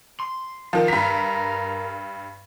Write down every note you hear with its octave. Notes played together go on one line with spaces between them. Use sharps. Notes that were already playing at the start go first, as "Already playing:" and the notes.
C6
D#3 F3
G2 A#4 B6